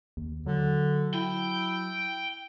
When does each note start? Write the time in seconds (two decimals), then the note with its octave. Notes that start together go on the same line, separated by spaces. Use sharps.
0.17 D#2
0.46 D3 F#3
1.14 E4 G5